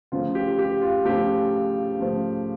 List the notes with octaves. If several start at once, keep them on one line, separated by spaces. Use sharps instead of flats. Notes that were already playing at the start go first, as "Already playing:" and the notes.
C#3 F3 A3 F4
G4
G4
F4
C#3 F3 A3 G4
C#3 F3 A3